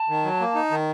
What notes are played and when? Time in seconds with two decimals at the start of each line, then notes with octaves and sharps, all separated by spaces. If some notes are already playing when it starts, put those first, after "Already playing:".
Already playing: A5
0.09 D#3
0.24 F#3
0.40 A#3
0.55 D#4
0.71 D#3